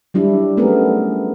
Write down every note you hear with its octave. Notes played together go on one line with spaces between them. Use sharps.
F#3 G3 D4 E4
A3 B3 C#4 G#4 A#4